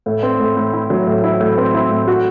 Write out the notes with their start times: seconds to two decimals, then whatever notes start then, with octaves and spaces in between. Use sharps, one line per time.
0.06 A2
0.23 C4
0.40 A2
0.57 A2
0.73 E4
0.90 F#3
1.07 A2
1.24 E4
1.40 A2
1.58 C4
1.74 E4
1.91 A2
2.08 F#4